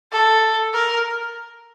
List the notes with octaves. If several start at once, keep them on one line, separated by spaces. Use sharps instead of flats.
A4
A#4